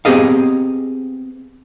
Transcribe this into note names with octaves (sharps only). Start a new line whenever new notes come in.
B3 C4 G4 G#4 D#5 F5